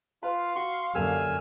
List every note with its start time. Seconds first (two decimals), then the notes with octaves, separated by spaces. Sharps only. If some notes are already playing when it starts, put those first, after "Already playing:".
0.23 F4 B4 F5
0.56 F#4 C6 C#6
0.95 F#2 D3 A#3 G4 A4 G#5 E6 F6